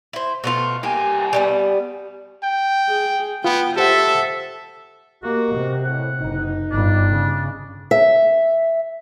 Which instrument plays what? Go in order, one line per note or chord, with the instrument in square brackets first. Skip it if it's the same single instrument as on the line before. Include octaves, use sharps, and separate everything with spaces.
[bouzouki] E4 C5
B2 A3 F4
[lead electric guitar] C2 G#5 [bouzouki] A#3 G4
[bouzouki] G3 A3 B3
[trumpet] G5
[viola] G#4
[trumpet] B3 [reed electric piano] F4 [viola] G5
[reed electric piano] G4 C5 F#5 [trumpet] A4 [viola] E5
[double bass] A#3 [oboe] F#4 [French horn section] G4 D#5
[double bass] C3
[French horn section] A2 [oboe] F#5
[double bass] F#1 [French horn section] D#4
[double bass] G1 G2 [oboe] D4
[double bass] C#3
[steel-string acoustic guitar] E5